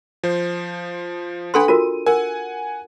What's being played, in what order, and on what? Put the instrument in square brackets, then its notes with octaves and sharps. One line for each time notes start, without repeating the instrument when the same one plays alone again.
[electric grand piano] F3 C5
[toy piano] D4 A4 C6 [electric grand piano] B4 F#5 B5
[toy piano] F4 F#4 A#4 [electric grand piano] D#7
[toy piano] A#4 [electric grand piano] F#5 G#5